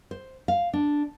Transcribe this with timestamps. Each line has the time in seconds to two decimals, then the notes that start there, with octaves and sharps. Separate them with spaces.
0.11 C5
0.48 F5
0.73 D4